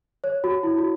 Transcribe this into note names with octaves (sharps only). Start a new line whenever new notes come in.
C#5
F#4
E4
F#4